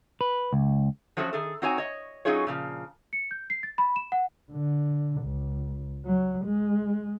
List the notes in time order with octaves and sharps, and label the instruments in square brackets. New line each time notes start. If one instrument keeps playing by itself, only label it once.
[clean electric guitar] B4
C#2
[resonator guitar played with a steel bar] F3 F#3 A3 C#4 F4 F#4
D#3 G#4 A4
C4 D#4 F#4 C#5 D#5 G#5
C#5 D#5
F#3 C#4 D#4 F4 G#4 C#5
A#2 C#3 F3
[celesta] C#7
G6
C7
A6
B5
E7
F#5
[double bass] D3
C#2
F#3
G#3